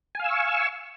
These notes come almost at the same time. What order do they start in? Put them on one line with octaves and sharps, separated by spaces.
G#5 F5 E6 C#6